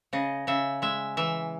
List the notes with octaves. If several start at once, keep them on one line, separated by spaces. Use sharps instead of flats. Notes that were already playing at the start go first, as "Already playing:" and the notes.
C#3 D#5
C#3 E5
G#3 E5
E3 E5